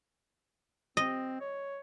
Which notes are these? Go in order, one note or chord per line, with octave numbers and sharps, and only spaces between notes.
C4 D#5
C#5